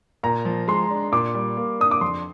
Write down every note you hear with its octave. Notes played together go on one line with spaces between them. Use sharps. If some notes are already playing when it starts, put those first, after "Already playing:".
A#2 A#5
F3
G#3 C6
D4
A#2 D6
G3
A#3
D4 D#6
D6
F2 C6